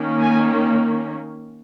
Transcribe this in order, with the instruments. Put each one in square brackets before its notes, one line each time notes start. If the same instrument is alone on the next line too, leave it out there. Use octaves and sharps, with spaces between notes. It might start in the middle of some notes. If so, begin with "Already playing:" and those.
Already playing: [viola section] D#3 A#3 C#4
G#5